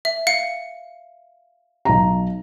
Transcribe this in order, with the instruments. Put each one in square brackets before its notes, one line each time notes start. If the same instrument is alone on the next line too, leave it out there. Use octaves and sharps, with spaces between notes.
[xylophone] E5
F5 C#7
[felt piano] B1 A#5